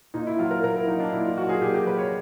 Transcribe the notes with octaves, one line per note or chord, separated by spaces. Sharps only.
A#2 D#4
E4
F#3 F4
A#4
A#2 A#4
E4
F#3 D#4
D4
A#2 E4
F4
F#3 F#4
G#4
A#2 G4
G4
F#3 B4
C#5